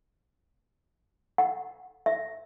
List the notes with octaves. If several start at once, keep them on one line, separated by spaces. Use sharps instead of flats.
F#5
E5